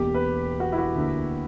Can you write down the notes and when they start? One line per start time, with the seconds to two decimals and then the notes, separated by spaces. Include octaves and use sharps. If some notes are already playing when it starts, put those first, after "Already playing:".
Already playing: E1 E2 B2 A#3 G4
0.14 B4
0.60 F#4
0.72 E4
0.78 F#4
0.96 D2 D3 A#3